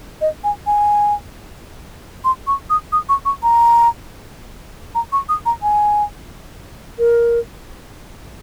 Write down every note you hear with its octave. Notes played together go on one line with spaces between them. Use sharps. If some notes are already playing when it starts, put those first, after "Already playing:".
D#5
G#5
G#5
C6
C#6
D#6
D#6
C#6
C#6
A#5
A#5
C#6
D#6
A#5
G#5
A#4